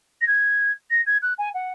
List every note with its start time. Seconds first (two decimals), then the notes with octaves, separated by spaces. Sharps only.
0.21 A#6
0.27 G#6
0.90 A#6
1.06 G#6
1.22 F#6
1.38 G#5
1.54 F#5